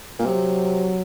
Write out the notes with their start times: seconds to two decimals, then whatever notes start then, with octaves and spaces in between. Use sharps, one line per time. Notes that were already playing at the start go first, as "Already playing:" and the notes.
0.19 A#2
0.25 C3 F#3